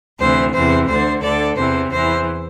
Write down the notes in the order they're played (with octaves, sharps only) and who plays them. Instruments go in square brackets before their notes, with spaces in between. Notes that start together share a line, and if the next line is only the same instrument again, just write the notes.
[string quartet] D2 C3 E3 C5
E2 C3 E3 C5
D2 D3 C5
D2 D3 A4 D5
E2 C3 E3 C5
E2 E3 C5